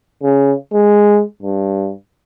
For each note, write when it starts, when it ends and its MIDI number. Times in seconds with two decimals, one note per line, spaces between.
0.23 0.53 49
0.72 1.22 56
1.43 1.91 43